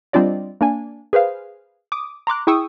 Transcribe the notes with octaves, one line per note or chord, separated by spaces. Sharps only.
G3 C4 D4 F4 D5 D#5
A#3 D4 G#5
G#4 B4 C5 F5
D6 D#6
A#5 C6 D6 F#6
E4 G#4 G5 C#6 D#6 E6